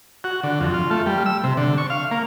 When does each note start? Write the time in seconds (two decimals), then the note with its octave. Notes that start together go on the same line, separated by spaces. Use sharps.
0.24 F#4
0.43 D3
0.60 F2
0.74 F4
0.91 A3
1.06 G3
1.26 E6
1.44 C3
1.57 D3
1.78 C#6
1.90 F5
2.11 A#3